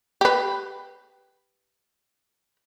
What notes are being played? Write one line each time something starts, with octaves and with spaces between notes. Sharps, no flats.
G4 B4